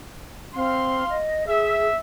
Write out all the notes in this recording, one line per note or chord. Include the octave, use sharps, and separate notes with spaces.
C4 F5 C6
D#5
G#4 E5